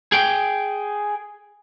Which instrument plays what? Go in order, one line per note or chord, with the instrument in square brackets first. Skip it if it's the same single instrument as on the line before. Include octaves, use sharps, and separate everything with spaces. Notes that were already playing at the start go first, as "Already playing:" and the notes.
[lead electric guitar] G#4 G5